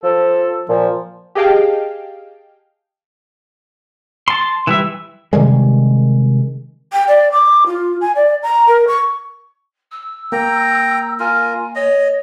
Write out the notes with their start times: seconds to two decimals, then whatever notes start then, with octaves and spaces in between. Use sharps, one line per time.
0.03 F3 A4
0.69 A#2 F3
1.35 G4 G#4 D#5 F5 G5 A5
4.28 A5 C6
4.67 E3 G3 E5
5.33 C3 D#3 G3 G#3
6.93 G5
7.08 D5
7.32 D6
7.66 F4
8.01 G#5
8.16 D5
8.43 A#5
8.67 A#4
8.88 C#6
9.92 E6
10.32 A#3 G5 A#5
11.20 F4 A#4 G#5
11.75 C#5 D#5